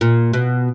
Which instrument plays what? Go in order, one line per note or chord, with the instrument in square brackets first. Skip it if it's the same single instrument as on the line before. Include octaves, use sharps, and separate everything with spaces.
[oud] A#2
B2